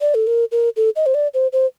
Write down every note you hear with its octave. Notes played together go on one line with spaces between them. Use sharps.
D5
A4
A#4
A#4
A4
D#5
C5
D5
C5
C5